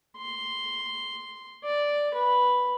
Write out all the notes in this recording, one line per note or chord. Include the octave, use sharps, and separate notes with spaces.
C6
D5
B4